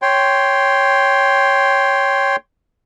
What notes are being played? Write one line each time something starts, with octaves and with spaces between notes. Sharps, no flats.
C#5 G5 C6